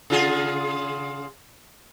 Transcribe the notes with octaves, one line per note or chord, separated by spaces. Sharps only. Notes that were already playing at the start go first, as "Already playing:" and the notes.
C#3 F4 G#4